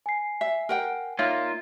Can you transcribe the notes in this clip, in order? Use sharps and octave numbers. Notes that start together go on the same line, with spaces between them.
G#5 C7
E5
A#4 F#5 G5
A#3 D#4 F4 C#5 E5 F5